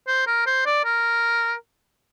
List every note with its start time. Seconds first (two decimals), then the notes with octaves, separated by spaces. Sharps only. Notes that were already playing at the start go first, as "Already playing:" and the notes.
0.07 C5
0.27 A#4
0.47 C5
0.66 D5
0.85 A#4